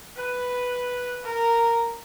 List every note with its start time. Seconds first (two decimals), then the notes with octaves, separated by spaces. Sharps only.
0.16 B4
1.24 A#4